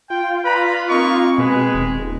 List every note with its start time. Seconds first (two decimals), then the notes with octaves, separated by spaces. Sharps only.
0.10 F4 G5
0.45 B4 D5 A#5 B5
0.89 A#3 C4 D#4 A#4 C#6
1.38 B2 G#3 G#4 B4
1.74 D#1